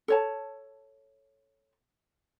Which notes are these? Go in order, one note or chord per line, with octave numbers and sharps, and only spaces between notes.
A4 C#5 A5